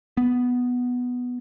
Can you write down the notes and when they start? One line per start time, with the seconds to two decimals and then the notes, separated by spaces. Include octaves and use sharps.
0.17 B3